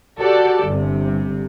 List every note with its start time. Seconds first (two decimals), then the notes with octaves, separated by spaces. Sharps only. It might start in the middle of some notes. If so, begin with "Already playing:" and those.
0.21 F#4 G4 A4 D5
0.66 G1 C3